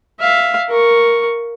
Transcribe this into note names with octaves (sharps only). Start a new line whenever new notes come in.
E5 F5
A#4 C#6